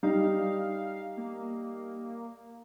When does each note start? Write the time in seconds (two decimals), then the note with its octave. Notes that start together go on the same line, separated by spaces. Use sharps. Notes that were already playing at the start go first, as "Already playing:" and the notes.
0.03 G3 D#4 F5
1.17 A#3